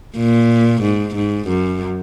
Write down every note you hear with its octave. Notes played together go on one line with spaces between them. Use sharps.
A#2
G#2
G#2
F#2